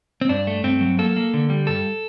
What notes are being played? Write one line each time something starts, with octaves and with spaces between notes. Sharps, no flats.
C4
G2 D4
A3
G2 C4
F#3
A#3 A4
A#3
D3
G3
G2 A4